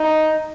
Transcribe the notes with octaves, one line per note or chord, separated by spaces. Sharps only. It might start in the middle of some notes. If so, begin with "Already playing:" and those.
Already playing: D#4